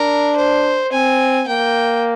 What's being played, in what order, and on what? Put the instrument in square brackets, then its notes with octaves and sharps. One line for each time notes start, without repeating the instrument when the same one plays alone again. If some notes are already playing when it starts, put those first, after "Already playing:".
Already playing: [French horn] D4 [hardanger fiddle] A#4
[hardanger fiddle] C5
[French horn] C4 [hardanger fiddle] G#5
[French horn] A#3 [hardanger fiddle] G5